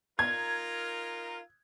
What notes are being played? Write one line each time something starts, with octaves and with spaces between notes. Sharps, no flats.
D#4 F4 A#4 G#6